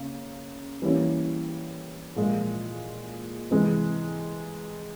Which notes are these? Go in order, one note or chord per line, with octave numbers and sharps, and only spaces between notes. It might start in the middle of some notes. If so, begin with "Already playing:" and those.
Already playing: C#3 A#3
E3 G3 A#3 C#4 E4
A#2 F3 G#3
C3 E3 G#3